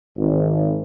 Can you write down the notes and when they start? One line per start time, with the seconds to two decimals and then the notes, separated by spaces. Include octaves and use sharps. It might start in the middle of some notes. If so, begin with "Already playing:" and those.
0.17 G#1